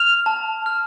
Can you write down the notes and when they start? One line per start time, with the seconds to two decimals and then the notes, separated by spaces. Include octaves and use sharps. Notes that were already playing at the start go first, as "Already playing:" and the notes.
Already playing: F6 F7
0.26 A5
0.66 F6